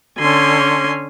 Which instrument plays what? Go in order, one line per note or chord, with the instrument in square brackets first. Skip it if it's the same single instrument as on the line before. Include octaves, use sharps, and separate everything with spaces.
[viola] D3 C#4 [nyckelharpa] G#5 C6